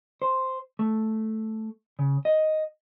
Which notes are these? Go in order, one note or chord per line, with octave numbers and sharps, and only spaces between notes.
C5
A3
C#3
D#5